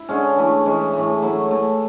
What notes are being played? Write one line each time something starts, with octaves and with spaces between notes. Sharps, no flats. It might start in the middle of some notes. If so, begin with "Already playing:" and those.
Already playing: E4
D3 G#3 C#4
E3 A3 E4
E3 G#3 C#4
A2 E3 A3
F#3 A3 E4
E3 A3 E4